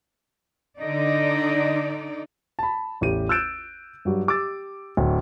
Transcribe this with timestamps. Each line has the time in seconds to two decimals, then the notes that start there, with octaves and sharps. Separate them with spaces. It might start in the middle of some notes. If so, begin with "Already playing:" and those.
0.80 D3 D#4 D5 D#5
2.59 A5 B5
3.01 A1 E2 G4 D#7
3.29 E6 F#6 G6 A6 D7 E7
4.05 G2 F#3 G3
4.27 G4 D6 E6 A6
4.97 D1